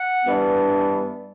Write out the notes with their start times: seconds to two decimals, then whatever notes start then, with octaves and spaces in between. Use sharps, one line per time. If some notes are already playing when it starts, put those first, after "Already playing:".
Already playing: F#5
0.25 G2 E3 G3 B3 D4